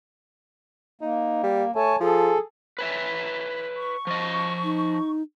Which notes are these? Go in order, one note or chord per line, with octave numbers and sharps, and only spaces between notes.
A#3 D#4
G3
A3 C#5 G#5 A5
F3 G#4 A4
B4 C#5 E5
C#6
F3 D#5
D#4